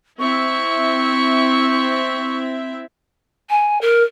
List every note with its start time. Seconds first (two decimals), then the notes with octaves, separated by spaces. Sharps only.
0.19 C4 E4 E5 C#6
3.50 G#5
3.81 A#4